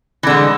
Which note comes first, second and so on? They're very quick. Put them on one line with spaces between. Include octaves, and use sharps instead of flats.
E3 D3 G#3